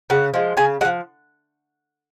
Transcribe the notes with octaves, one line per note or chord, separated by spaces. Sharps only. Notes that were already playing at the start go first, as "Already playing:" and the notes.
C#3 F#5
F3 G#3
C#3 G#5
G#3 F#5
F3